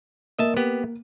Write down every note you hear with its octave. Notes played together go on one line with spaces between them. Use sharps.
A#3 D#5 E5 A5
B3 G4